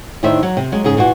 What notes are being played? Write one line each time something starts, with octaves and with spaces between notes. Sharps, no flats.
A2 D#3 D4 D#4 C5 E5
F#3
C3
F#3 G#3
G#2 C#3 G#4
A#2 E3 F4 F#4